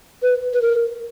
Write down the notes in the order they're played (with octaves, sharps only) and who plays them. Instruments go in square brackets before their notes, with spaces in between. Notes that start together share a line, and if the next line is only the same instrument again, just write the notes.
[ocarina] B4
B4
A#4